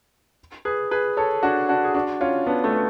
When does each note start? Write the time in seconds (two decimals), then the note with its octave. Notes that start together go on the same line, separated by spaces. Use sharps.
0.65 G#4 B4
0.91 G#4 B4
1.17 A4 C#5
1.43 D4 F#4
1.69 D4 F#4
1.84 G#4
1.94 D4 F#4
2.21 C#4 F4
2.47 B3 D4
2.64 A3
2.73 B3